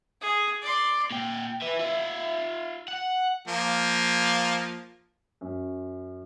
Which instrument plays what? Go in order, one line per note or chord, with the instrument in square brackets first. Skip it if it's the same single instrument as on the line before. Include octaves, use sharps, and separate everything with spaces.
[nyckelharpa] G#4
D5 C6
[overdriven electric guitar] A#2 G5
B4 E5
F4 E5
F#5
[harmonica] F3 A#3
[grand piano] F#2